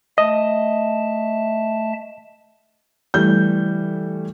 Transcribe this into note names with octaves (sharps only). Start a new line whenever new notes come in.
A3 D#5 E5 A5
E3 G3 A3 G6